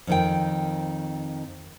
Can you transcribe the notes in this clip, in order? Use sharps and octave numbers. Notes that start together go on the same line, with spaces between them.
F2 D#3 G5